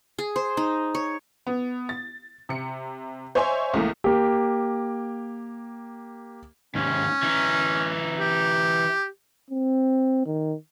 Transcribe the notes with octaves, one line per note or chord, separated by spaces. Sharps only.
G#4
C5
D#4
C#5
B3
A6
C3 C#7
C5 C#5 D#5 E5 G#5 C6
C#2 E3 A3 A#3
A#3 G4
D#2 G#2 C#4
E3 D#4
G4
C4
D#3